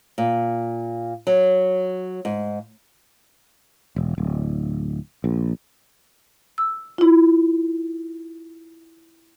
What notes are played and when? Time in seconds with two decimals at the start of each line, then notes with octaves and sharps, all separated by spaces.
0.18 A#2
1.27 F#3
2.25 G#2
3.96 E1
4.18 D1
5.24 A#1
6.58 E6
6.98 E4 F4